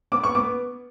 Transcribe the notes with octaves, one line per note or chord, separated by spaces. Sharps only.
B3 D6
C#6
B3 D6